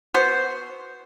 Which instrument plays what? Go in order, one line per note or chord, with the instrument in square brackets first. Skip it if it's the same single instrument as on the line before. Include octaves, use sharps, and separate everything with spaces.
[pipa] B3 F#4 C5